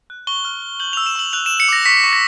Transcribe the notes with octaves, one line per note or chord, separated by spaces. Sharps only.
F#6
C#6 G7
F6
F6
G6 F#7
F7
E6
E7
C#6 F#7
F#6 F7
E7
F#6
C#7
D6 A#6
C#6 B6
C#6
A#6